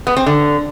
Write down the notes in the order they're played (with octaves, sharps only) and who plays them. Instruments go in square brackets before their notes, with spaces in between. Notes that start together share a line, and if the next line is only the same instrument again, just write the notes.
[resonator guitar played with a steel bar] B3
C4
D3